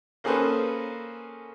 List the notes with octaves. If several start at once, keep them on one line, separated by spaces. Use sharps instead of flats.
A#3 C#4 G#4 A4 B4 C5